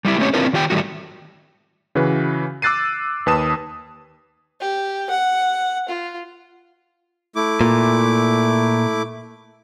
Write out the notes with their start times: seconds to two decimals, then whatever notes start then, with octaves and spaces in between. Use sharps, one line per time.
0.05 G3 A3 E4 G4
0.18 A3 C4 C#4 G4 C#5
0.34 C4 D4 E4 F4 A#4 B4
0.53 D#3 F4 G4 G5
0.70 A2 D#3 G3 A3 F#4
1.95 C#3 E3 F#4 B4
2.62 D6 E6 F#6 A6 C7 D#7
3.26 D#2 B4 A5 D#6 E7
4.60 G4
5.10 F#5
5.89 F4
7.36 A3 E4 D6
7.61 A#2